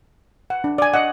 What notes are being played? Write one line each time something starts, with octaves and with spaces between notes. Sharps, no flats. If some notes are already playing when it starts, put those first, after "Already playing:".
F#5
D4
D5 G#5
D#5 F#5